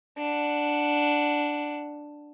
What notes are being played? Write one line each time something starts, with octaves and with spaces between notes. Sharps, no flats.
D4 F#5